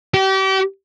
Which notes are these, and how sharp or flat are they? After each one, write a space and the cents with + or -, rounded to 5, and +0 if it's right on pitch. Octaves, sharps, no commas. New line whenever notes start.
G4 -35